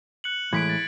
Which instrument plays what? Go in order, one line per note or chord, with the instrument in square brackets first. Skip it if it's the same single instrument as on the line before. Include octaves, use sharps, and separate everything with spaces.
[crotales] F#6 C#7 F#7
[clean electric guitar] A2 E3 G#3 [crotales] G#6 B6 D7
[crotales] A6